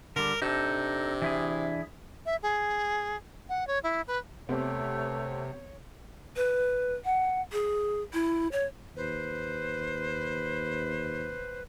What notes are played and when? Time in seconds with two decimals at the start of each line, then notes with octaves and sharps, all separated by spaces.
0.16 D3 G3 A#4
0.42 C3 D4 D#4 A4
1.22 E3 E4 G#4
2.26 E5
2.42 G#4
3.49 F#5
3.67 C#5
3.83 E4
4.07 B4
4.49 C3 A3 B3 C4 G4 C#5
6.36 B4
7.05 F#5
7.52 G#4
8.13 E4
8.52 C#5
8.96 D#2 B4 C5